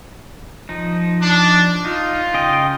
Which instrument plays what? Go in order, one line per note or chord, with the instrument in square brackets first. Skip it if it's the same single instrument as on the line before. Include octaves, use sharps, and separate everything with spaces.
[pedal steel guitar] F3 D#4
[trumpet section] D4
[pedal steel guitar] D#4 [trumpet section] F4
[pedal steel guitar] C#3 D#5 G5